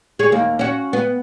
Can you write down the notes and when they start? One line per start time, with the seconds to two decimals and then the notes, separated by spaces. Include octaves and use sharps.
0.19 G#4 C#5
0.32 D#2 A#3
0.59 C#4 F#4
0.93 B3